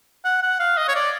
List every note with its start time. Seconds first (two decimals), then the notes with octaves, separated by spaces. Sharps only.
0.25 F#5
0.42 F#5
0.60 F5
0.77 D#5
0.88 C#5
0.95 D5